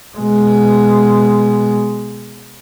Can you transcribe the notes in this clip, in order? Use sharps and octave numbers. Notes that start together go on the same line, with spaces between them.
B2 G#3